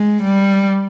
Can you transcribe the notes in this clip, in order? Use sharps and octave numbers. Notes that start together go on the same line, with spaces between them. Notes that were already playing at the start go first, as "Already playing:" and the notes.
Already playing: G#3
G3